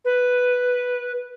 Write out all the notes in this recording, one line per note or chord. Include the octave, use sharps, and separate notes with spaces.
B4